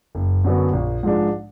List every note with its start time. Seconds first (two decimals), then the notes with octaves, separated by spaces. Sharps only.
0.15 F#1
0.44 F#2 D3 F#3 B3
0.73 A#1
1.03 G#2 F3 G#3 D4